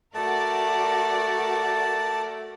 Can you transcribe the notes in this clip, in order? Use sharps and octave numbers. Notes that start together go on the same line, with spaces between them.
A3 F#4 A#4 D5 F#5 A5